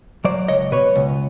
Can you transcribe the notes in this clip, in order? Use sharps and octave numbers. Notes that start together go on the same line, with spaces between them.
F#3 C5 D5
C#2 C#5 D#5
B2 B4 C#5
C#2